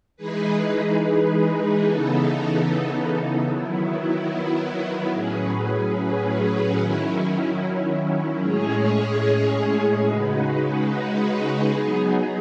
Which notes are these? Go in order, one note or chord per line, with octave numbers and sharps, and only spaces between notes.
E3 G#3 D#4 G#4 B4
C#3 E3 B3 D#4 A4
D#3 F#3 B3 E4
A2 F#3 C#4 G#4 B4
D#3 F#3 C#4 E4
A2 G#3 C#4 G#4 C#5
C#3 G#3 D#4 F#4 B4
F#3 B3 D#4 G#4